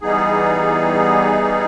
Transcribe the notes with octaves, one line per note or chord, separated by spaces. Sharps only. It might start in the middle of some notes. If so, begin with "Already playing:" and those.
E3 G3 B3 D#4 G#4